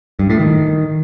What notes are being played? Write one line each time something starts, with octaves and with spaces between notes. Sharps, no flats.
G2
A2
D#3